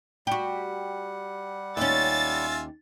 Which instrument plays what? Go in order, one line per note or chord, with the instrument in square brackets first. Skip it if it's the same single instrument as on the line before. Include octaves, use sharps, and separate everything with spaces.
[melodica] G3 F#5 [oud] F#4 G4
[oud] D#2 C#4 [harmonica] F4 E5 G#5 [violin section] A6